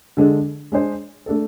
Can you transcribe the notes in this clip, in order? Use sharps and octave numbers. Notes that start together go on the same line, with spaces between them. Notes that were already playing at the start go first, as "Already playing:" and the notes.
D3 G#3 D4 A4
G#3 D4 G#4 C5
A3 D4 A4